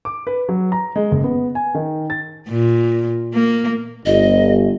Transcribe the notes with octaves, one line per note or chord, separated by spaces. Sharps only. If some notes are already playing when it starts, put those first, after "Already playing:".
D6
B4
F#3
A#5
G#3
F#1
B3
G#5
D#3
A6
A#2
A#3
G1 D#5